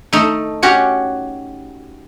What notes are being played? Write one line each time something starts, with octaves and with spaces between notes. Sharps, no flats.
A3 D#4
C#4 F#4 G4 C#5